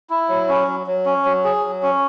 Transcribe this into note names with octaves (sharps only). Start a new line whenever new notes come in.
E4
F#3
C#4
F#3
F#3
C#4
F#3
G#4
F#3
C#4